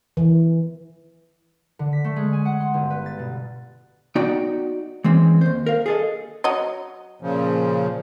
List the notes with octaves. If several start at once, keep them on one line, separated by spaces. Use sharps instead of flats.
E3
D3
B6
A3
G#3
G#5
F#5
C6
G1
B4
A6
B2
B3 D#4 F#4 D5 G5 A#5
E3 G#3 C4 C#4
D#2 C5
A#4 F5
G#4 A4 D#5
F#3 D#5
A#2 C#3 F3